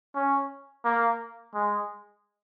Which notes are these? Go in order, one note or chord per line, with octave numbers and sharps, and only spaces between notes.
C#4
A#3
G#3